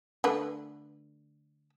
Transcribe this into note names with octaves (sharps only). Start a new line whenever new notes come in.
D3 A3 B4